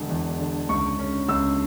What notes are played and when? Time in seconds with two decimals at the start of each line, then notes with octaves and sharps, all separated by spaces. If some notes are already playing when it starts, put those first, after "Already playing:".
Already playing: E1 D3
0.09 E2
0.39 D3
0.69 C#2 C#6
0.99 C#4
1.29 C#2 E6